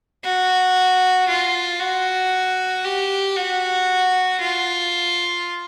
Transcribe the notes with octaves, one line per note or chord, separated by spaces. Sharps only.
F#4
F4
F#4
G4
F#4
F4